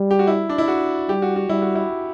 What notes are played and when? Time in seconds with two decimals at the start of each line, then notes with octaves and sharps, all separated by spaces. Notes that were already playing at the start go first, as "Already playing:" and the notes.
Already playing: G3
0.11 G4
0.19 F#4
0.27 E4
0.49 D4
0.58 E4
0.68 F#4
1.09 G3 G4
1.22 F#4
1.36 F#4
1.49 G3 E4
1.62 F#4
1.75 E4